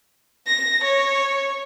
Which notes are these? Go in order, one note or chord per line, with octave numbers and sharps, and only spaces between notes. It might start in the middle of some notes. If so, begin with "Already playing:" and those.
A#6
C#5